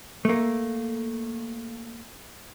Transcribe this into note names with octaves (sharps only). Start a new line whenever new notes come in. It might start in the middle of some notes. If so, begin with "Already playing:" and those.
A3 A#3